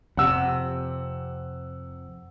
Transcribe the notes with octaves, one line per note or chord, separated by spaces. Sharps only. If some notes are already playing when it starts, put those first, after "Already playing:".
F2 C3 F#5 E6